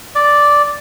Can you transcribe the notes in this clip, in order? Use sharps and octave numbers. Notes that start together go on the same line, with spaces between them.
D5